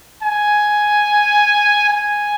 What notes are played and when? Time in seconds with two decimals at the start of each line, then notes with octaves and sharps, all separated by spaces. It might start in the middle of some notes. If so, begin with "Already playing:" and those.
0.23 G#5
1.90 G#5